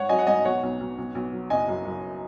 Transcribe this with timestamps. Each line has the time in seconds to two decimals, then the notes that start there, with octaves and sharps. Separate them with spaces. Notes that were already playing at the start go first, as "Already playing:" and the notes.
Already playing: G#2 C#5 F#5
0.09 F#3 D#5 G#5
0.19 F#5
0.27 G#2 D#5 G#5
0.45 B1 C#5 F#5
0.63 B1
0.80 B1
0.98 B1
1.15 B1
1.33 F#3
1.50 F#1 D#5 G#5
1.68 F#2
1.85 F#2